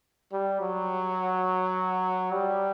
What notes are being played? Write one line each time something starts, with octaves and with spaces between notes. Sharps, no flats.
G3
F#3
G3